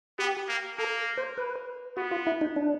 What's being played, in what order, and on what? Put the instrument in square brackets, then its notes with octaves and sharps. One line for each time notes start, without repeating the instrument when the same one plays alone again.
[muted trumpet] B3 [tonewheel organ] G4
[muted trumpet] A#3
[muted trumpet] A#3 [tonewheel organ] A4
[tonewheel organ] C5
B4
[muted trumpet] B3 [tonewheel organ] F#4
[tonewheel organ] F4
E4
D#4
D4